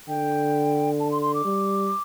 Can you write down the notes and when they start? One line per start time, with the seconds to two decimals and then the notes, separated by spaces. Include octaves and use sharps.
0.08 D3 G5
1.00 A5
1.11 C6
1.22 C6
1.34 D6
1.45 G3